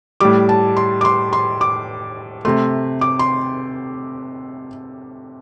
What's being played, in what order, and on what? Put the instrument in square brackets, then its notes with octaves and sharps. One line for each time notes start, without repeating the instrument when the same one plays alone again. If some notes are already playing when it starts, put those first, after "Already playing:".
[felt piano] A2 G3 D6
A5
C6
D6
C6
C6
D6
C3 A3 C6
D6
C6